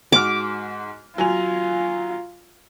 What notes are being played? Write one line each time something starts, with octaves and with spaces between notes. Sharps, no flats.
G#2 F#4 D6 F6
F#3 F4 G#5 F7